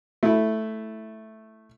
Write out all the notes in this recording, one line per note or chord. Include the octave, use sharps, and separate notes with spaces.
A3 E4